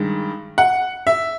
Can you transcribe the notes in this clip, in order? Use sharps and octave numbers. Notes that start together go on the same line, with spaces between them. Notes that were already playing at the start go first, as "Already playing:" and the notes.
Already playing: G2 D#3 G#3
F#5
E5